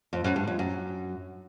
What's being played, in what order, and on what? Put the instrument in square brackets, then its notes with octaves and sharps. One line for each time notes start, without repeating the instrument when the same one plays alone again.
[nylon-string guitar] F2
F#2
G2
F2
F#2